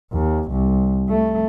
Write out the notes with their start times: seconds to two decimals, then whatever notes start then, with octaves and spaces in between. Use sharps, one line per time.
0.13 D#2
0.52 C2
1.09 A3